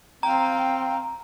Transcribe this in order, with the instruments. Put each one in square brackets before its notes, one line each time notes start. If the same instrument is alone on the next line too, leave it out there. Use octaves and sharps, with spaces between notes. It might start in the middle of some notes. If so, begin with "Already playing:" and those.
[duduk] C4 [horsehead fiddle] F5 G5 [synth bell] A#5